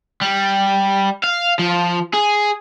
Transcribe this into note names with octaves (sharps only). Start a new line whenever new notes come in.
G3
F5
F3
G#4